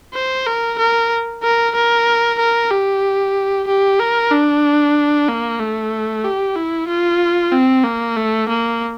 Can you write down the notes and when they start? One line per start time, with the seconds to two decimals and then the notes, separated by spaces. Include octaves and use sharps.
0.14 C5
0.46 A#4
0.79 A#4
1.43 A#4
1.75 A#4
2.39 A#4
2.71 G4
3.68 G4
4.00 A#4
4.32 D4
5.28 A#3
5.60 A3
6.24 G4
6.56 E4
6.88 F4
7.52 C4
7.84 A#3
8.16 A3
8.49 A#3